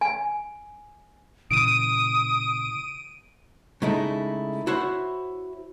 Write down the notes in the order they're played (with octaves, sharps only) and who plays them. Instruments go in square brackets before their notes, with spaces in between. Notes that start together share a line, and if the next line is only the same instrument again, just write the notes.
[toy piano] G#5
[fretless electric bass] A#2 C#3 E3 [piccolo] D#6 [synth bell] D7 D#7
[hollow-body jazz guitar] C#3 G#3 A3 D#4 E4
E4 F#4 C5 C#5